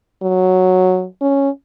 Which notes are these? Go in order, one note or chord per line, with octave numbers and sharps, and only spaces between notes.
F#3
C#4